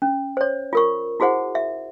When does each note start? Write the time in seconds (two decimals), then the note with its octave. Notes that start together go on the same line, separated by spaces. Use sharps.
0.02 C#4
0.37 C5 C#5
0.73 F4 A#4 C#6
1.20 E4 F#4 G#4 C5 F#5
1.55 E5